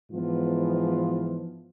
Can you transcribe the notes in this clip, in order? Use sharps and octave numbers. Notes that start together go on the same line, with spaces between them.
G#2 E3 F3 B3 F4